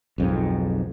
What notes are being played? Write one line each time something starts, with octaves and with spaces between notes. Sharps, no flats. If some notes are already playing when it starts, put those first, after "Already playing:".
B1 F2 G#2